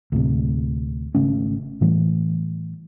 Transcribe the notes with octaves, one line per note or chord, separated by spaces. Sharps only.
D2 A2 C3
G#1 C#3 A3 C#4
A2 E3 G3 A3